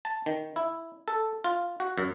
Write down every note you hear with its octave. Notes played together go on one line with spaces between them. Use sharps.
A5
D#3
E4
A4
F4
F#4
F#2